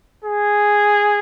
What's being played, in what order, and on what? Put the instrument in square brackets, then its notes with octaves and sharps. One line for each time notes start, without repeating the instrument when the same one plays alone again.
[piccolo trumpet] G#4